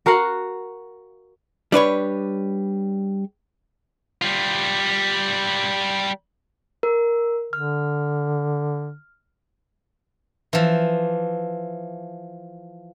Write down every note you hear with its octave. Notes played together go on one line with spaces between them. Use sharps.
F#4 A#4 F5 F#5
G3 D4 B4 C#5
G3 F4
A#4
D3 F6
E3 F3